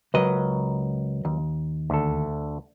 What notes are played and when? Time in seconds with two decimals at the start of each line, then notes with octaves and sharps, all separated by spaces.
0.14 C#2 F#3 A#4 B4 D#5
1.25 D#2
1.90 D2 A4